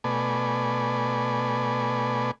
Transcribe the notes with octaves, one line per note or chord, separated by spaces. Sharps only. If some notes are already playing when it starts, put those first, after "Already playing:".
B2 A3 B4 D5 G#5